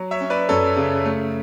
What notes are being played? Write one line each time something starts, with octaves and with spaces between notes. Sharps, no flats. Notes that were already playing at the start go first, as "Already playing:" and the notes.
Already playing: F#3
C#5 E5
C#4
B4 D5
F#2 A4 C#5
C#3
A3